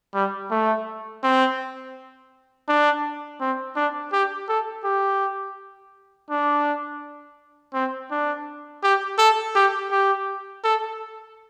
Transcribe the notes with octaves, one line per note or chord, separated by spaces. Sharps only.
G3
A3
C4
D4
C4
D4
G4
A4
G4
D4
C4
D4
G4
A4
G4
G4
A4